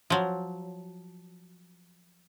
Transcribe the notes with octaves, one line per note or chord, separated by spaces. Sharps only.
F3 F#3